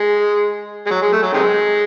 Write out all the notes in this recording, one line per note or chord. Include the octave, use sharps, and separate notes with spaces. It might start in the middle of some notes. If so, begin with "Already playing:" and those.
Already playing: G#3
G#3
F#3
G#3
A3
F#3
C3 D#3 G#3